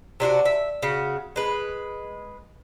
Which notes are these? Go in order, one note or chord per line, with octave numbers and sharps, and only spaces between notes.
C3 D4 F4 F#4
E5
C#3 F#4
G#3 B4